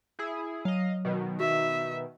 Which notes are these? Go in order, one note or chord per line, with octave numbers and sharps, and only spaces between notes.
E4 G#4
F#3 D#5 F5
B2 D#3
F#4 E5